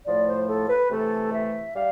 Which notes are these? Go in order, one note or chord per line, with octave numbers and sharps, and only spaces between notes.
A2 F3 A3 D5
C5
A4
B4
C3 E3 A3 A4
E5
G3 F5